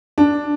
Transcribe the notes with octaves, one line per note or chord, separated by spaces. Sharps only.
D4